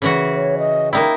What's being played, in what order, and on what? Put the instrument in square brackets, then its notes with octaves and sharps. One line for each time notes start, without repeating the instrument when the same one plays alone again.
[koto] C#3 E3 F#4
[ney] C#5
D#5
[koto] A#3 D#4 E4 [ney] G5